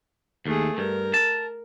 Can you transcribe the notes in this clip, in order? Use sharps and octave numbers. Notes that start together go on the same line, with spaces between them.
D#2 A3 G#4
G2 A#4
A5